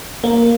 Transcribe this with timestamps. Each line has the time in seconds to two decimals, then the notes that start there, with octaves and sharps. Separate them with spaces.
0.24 A#3